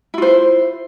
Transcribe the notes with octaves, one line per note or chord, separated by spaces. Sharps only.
E4 F4 C5